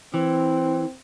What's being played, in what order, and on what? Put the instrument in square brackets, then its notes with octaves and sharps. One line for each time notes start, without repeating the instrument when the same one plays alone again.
[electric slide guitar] E3 [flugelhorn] C4